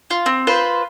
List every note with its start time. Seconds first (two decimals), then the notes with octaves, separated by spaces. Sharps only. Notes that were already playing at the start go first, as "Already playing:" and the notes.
0.10 F4
0.26 C4
0.47 F4 B4 C5